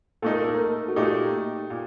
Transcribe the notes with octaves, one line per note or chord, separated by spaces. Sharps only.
A#2 A3 D#4 A4
A#4
A4
A#4
A4
F#4
A#2 A3 D#4 G4
A#2